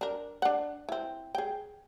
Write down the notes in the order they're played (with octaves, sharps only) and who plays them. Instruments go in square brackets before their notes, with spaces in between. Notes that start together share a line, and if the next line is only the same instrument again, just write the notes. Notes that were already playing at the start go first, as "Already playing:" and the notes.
[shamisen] D4 A#4
D4 F#5
C4 E4
G#4 G5